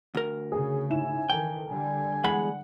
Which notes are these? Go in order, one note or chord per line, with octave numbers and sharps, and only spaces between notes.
D2 A#4
C#3 G#4
G#2 E4 G#5 E7
D#3 E3 A4 A#4 G5
D3 G3 G#5
E2 G#3 F#5 B5